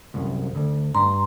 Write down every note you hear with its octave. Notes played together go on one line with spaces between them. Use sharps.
C2 F#2
D2
G2 A#5 C6